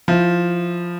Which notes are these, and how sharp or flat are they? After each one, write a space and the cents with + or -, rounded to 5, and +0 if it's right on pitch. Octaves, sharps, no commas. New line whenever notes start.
F3 +0 E4 +15